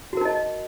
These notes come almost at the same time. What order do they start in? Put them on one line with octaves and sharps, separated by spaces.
F#4 A#4 D#4 D#5